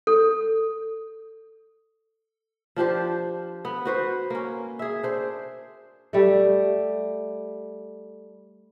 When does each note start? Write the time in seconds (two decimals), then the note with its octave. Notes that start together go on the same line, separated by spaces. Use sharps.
0.07 A4
2.76 F3 D4 G4 C5
3.65 B3
3.85 F#4 B4 C5
4.30 A#3 C#4
4.79 G#4 E5
5.03 D4 C5
6.13 G3 A3